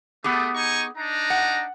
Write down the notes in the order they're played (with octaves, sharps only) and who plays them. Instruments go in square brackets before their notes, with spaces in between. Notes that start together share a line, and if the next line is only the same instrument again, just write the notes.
[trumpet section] A3 [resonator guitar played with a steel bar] B3 G4 G#4
[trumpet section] D#4 G#5 C#6
D4 D#4 A#5
[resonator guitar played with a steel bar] F#5